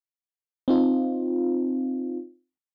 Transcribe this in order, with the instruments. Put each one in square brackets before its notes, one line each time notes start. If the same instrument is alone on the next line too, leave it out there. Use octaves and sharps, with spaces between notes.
[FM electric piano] C4 D#4 F4